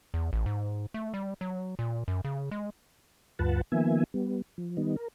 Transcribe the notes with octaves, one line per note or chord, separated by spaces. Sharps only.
E2
A1
G#2
A3
G3
F#3
A#2
F#2
C#3
G#3
D2 G2 F4 B4 F#5 A5
D#3 F3 A#3 B3 E5 G#5
G3 B3
F3
D#3 G3 B3 D#4
A#4